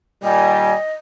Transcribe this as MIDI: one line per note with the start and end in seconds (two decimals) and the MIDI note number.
0.23 0.73 46
0.23 0.73 51
0.23 0.73 55
0.23 0.93 75
0.23 0.74 80